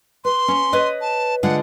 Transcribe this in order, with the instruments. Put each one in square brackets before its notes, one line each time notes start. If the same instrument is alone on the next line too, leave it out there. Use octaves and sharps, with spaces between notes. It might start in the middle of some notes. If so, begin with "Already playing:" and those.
[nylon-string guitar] B4 [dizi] C6
[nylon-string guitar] C#4
B4 C#5 D#5
[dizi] A5
[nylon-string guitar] D3 G#3 F4 [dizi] F#5